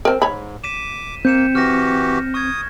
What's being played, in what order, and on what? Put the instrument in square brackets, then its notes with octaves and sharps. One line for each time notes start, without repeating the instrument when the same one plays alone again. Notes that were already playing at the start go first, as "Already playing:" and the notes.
[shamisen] C4 A#4
[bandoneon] G#2 [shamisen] C#5 B5
[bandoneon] D6 [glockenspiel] B6 D#7 E7
[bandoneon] A#3 [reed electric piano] C4 [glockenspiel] G6 C#7 E7
[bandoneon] E3 F#4 G4 [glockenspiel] F6 A#6
[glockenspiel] C#6 G#6 [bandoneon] D#6